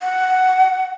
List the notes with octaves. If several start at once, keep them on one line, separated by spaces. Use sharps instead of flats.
F#5